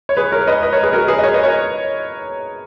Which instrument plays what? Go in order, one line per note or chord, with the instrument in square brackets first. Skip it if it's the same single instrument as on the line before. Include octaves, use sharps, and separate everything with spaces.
[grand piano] C#5
G#4 B4
A#4 C#5
B4 D#5
B4 D#5
A#4 C#5
G#4 B4
F#4 A#4
G#4 B4
D#5
A#4 C#5
B4 D#5
A#4 C#5